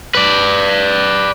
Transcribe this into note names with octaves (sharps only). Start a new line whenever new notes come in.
B4 D5